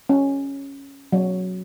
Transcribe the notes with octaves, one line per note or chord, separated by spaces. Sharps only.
C#4
F#3